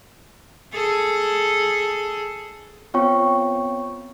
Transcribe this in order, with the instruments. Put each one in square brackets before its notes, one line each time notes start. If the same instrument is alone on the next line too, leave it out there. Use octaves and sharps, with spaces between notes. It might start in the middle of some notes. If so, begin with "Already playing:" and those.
[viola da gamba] G#4 A4
[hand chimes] B3 C4 F4 C#5 G5 C#6